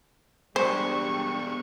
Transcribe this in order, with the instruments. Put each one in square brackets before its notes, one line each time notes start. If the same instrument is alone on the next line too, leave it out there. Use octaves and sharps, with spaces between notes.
[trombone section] G3 [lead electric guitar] G#3 B3 [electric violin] D4 C#6 [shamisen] C5